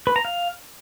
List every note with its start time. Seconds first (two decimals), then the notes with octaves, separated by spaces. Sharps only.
0.07 B4
0.16 A#5
0.25 F5